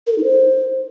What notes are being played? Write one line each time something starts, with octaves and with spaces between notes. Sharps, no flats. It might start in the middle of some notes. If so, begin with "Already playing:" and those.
A#4
A4
D#4
C5